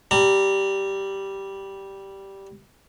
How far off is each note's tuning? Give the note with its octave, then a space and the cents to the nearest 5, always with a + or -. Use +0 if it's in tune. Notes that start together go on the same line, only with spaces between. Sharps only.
G3 -5 A#5 -35